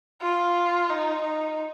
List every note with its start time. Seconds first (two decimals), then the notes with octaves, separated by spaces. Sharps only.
0.22 F4
0.90 D#4
1.22 D#4